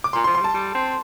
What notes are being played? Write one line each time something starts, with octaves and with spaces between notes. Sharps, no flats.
D6
A#2 C6
F3 C6
F3 C6
G3 A5
G3
C4